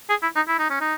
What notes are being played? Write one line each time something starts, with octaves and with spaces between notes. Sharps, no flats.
G#4
E4
D#4
E4
D#4
C#4
D#4